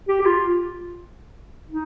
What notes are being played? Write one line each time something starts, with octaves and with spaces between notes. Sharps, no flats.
G4
G4
F4
D#4